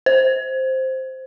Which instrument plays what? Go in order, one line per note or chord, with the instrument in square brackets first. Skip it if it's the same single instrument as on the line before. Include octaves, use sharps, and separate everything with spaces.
[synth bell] C5